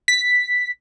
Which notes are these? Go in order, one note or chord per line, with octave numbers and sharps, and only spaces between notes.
B6